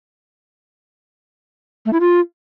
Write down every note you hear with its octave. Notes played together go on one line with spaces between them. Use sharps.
A3
E4
F4